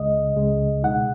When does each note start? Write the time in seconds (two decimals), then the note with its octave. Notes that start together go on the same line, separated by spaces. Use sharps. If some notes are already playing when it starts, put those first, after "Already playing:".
Already playing: C#2 C#3 G#3 D#5
0.36 C#2 C#3 G#3
0.83 B2 G#3 D#4 F#5